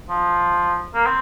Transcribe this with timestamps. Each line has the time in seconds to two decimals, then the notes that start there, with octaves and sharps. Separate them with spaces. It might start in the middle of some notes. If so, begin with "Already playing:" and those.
0.10 F3
0.95 A#3
1.06 C4